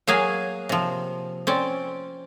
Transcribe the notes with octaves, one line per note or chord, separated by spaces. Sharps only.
F#3 A#3 G#4 F5 G#5
C3 F3
C4 C#4 D5